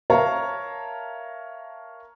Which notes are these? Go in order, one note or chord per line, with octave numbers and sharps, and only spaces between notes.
A#4 C#5 E5 F5 A5 A#5